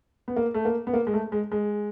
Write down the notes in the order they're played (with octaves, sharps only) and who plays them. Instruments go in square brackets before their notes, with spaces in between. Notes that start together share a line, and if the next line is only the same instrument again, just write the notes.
[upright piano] B3
A#3
A3
A#3
B3
A#3
G#3
A3
G#3
G#3